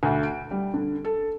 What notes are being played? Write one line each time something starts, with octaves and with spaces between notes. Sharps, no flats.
D2
D7
G3
D3
A4